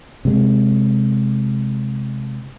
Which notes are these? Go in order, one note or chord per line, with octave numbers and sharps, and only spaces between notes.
C3 G#3